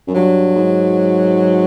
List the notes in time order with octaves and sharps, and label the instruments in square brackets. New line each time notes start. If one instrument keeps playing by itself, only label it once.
[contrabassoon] F#2
[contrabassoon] G2 [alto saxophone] F#3
[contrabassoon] G#2